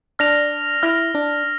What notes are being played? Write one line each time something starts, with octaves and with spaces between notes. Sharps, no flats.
D4 F6 A#6 F7
E4 F6 A#6 F7
D4